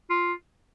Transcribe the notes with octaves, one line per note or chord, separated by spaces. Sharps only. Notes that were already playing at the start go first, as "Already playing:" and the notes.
F4